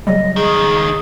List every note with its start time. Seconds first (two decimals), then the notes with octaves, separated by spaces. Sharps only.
0.07 C#3 F#3 G3 D#5
0.36 C#2 D#3 G#4